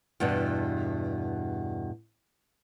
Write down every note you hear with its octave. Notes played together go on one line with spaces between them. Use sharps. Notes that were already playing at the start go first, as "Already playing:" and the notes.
E2 G2 B2 D4